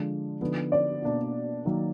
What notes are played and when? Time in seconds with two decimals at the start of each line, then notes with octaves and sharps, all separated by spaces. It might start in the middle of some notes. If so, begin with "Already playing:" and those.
Already playing: D3 F3 G#3 D4 F4
0.41 D3 F3 B3 D#4
0.72 D5
1.02 B2 A#3 D4
1.65 D#3 F#3 A#3